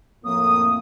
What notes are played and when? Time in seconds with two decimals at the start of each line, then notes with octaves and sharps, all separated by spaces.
0.25 F2 A2 A#3 D#6